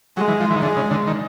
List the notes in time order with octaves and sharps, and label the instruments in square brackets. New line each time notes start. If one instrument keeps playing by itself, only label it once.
[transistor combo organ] F#3 [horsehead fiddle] G#3
[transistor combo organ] E3
F3
E3
D#3
[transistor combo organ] D3 [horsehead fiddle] G#3
[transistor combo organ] C#3
D3
D#3